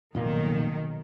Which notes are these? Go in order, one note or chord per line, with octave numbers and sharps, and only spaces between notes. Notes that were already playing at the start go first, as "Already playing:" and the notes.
F1 B1 A#2 D#3 A#3